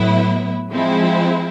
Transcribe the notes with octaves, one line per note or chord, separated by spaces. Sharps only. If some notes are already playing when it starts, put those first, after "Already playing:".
Already playing: A2 F#3 B3 E4
F3 G#3 C4 E4